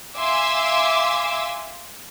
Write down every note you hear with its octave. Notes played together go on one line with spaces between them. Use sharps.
E5 F5 G#5 C6 D6 E6